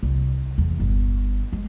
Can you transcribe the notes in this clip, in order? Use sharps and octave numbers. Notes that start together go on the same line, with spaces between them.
C2
E2
G1
G#3